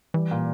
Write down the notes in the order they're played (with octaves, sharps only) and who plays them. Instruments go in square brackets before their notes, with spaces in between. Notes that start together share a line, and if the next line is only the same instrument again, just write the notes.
[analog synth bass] E3 [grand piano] G3
[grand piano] A#2